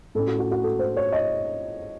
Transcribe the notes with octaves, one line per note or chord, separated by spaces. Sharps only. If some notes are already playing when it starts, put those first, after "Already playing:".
A2 A3 C#4 A4
F#4
F#4
F#4
A4
C5
C#5
D#5